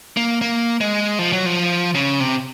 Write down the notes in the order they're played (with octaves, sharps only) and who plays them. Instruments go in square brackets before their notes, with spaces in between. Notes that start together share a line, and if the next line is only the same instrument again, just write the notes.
[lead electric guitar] A#3
A#3
G#3
F3
F#3
F3
C#3
C3